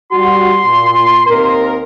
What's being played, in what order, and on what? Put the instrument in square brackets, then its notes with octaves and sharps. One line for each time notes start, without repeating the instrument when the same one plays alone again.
[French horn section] G3 F#4 [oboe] C6
[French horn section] A#2
D#2 C4 A#4